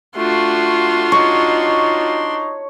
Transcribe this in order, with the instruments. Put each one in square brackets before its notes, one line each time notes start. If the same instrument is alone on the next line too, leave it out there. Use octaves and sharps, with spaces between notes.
[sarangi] A3 [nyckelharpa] D4 C6 [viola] F4 F#4
[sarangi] D#4 [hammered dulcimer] C#5